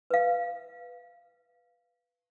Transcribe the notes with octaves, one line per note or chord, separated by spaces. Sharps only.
B4 F5